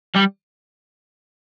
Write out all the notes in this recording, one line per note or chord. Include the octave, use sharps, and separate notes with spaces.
G3